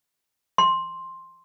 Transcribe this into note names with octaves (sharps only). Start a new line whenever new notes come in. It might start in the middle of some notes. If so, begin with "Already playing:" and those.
C6